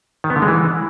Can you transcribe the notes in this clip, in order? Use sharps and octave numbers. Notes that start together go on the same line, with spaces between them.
D#3
B3
D3
G#3
E3